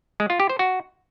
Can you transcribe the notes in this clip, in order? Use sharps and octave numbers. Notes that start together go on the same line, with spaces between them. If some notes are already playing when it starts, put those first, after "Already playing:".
G#3
F4
G4
C5
F#4